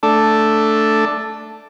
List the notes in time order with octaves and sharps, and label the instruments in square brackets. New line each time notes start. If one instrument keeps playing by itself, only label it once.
[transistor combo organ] A3 D4 A4